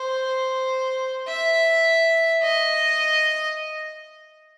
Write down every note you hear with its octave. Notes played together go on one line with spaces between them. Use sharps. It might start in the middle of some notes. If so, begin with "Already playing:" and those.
Already playing: C5
E5
D#5